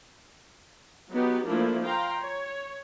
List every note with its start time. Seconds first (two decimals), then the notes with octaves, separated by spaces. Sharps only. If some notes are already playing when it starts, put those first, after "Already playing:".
1.12 F#3 B3 D#4 G4
1.47 F3 A3 A#3 D4 E4
1.84 F5 G5 A#5 C6
2.20 C#5